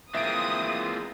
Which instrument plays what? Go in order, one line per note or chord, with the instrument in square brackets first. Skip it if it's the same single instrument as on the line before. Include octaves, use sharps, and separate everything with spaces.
[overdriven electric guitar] E3 G#3 [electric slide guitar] A#3 C4 F4 [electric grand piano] E5 D7 [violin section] D#6